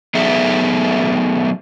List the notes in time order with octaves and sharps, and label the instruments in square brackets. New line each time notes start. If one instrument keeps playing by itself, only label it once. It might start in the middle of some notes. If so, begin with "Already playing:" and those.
[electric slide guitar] F#3 A3 B3 D#4 G#4 E5